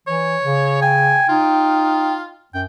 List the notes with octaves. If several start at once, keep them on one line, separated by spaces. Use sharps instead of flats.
E3 C#5
C#3
G5 G#5
D#4 F4
F#2 G5